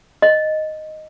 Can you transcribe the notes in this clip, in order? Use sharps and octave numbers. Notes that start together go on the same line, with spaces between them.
D#5